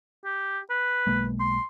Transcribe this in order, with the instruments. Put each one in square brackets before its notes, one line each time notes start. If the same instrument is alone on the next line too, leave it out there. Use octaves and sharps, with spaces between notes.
[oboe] G4
B4
[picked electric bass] B1 G#3 A#3
[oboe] C6